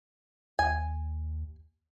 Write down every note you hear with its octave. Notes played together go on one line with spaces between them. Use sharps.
D#2 G#5